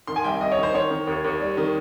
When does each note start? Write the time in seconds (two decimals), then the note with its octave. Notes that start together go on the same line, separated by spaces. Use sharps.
0.07 D#3 C6
0.16 G#5
0.24 C2 G5
0.40 C2 D#5
0.51 C#5
0.58 D#3
0.63 C5
0.74 D#3 C#5
0.90 D#3
1.07 D#2
1.24 D#2
1.40 G3
1.57 D#3